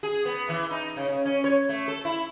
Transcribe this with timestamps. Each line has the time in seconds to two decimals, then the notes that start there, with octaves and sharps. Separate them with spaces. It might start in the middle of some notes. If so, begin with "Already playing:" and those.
0.03 G#4
0.25 B3
0.49 E3
0.71 D#4
0.97 C#3
1.08 C#3
1.25 C#4
1.44 C#5
1.69 A3
1.88 A4
2.05 E4